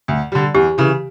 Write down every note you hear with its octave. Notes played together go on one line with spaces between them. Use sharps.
D2
D3 G3
E2 G4
C#3 E3